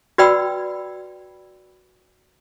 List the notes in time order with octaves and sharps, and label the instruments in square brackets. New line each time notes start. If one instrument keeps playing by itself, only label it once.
[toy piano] F#4 B4 D5 G5 B5 E6